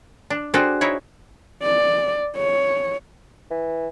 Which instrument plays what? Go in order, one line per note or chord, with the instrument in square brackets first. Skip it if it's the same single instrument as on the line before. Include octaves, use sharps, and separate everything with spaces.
[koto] D4
[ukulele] D4 F#4 C5 [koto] G#4 A4 G5
[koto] D#4 E4 C#5
[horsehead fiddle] D5
C#5
[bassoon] E3